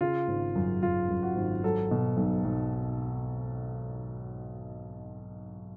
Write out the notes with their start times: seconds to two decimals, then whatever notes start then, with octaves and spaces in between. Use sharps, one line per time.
0.01 C#3 F4
0.28 G#1
0.55 F#2
0.82 F#2 F4
1.09 F#2
1.23 F#4
1.36 G#1
1.64 F#3 A4
1.91 B2
2.17 B1
2.45 B1